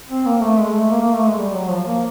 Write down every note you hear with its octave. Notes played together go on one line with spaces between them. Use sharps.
C4
A#3
A3
G#3
A3
A#3
A#3
A3
G#3
G3
F#3
F3
A#3